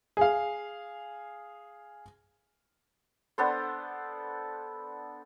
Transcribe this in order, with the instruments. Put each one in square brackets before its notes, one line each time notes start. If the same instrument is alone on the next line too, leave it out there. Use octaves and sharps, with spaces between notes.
[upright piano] G#4 F5
[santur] B3 D4 A4 C5